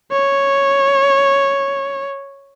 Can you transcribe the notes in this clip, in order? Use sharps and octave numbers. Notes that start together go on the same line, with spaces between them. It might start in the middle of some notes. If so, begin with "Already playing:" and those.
C#5